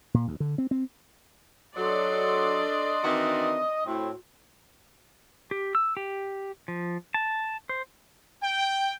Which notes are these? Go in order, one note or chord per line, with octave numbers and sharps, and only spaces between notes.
A#2
D2
D3
C4
C4
F#3 D4 A4 D5 D#5 C6
D#3 E3 C4 F#4
A2 C4 F#4
G4
E6
G4
F3
A5
C5
G5